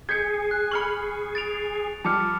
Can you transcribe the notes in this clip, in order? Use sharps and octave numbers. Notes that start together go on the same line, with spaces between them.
G#4 G6 G#6 B6 C#7
F#6
B5 C#6 F6 C#7 F#7
A6 D7 F7
F3 G3 A5 D6 F6 C#7